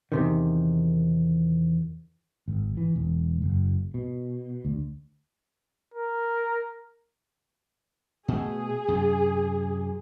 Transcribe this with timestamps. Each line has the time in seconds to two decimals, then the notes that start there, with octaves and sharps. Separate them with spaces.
0.12 E2 C3 D#3
2.48 G#1
2.77 E3
2.96 E1
3.42 F#1
3.94 B2
4.65 D2
5.94 A#4
8.28 B2 A3 G#4
8.88 F#2 C3